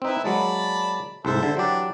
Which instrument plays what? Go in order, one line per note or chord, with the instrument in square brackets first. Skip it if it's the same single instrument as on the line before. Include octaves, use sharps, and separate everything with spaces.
[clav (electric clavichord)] C4 D#4 [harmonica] E4 B4 E5
[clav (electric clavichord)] F#3 G#3 A#3 [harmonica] D5 A5 B5
[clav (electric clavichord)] C2 G#2 [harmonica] A4 C5 E5
[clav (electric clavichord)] D3
[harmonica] E3 D4 [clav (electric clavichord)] F#3 G4